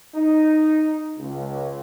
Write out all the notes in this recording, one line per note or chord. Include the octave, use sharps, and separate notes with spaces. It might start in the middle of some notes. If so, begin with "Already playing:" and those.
D#4
C#2